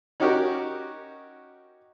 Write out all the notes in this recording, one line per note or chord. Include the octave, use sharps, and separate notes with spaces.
C#4 D#4 F#4 G4 A#4